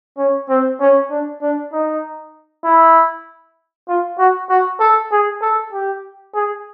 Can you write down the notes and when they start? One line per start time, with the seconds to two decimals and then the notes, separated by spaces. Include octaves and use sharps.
0.18 C#4
0.49 C4
0.80 C#4
1.10 D4
1.42 D4
1.72 D#4
2.65 E4
3.88 F4
4.18 F#4
4.49 F#4
4.80 A4
5.11 G#4
5.42 A4
5.73 G4
6.35 G#4